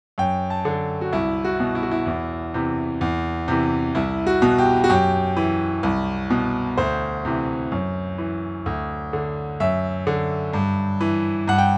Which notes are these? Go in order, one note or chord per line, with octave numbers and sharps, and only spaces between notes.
F#2 G5
A5
D3
F#4
C2 E4
F#4
B2
E4
F#4
E4
E2
C3 E3
E2
C3 E3
C2 E4
F#4
B2
G4
F#4
F#2 G4
E3
C2
B2
D2 C5
C3 E3
F#2
E3
D2
D3
F#2 E5
D3
G2
E3
G2 F#5
G5